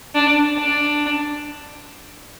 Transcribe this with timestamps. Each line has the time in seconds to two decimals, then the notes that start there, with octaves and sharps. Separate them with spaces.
0.15 D4
0.57 D4